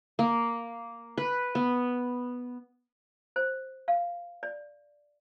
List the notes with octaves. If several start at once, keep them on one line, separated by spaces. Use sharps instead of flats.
A#3
B4
B3
C5
F5
D5